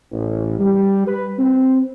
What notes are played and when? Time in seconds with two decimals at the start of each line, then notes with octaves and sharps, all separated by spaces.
0.12 A1
0.59 G3
1.07 B4
1.39 C4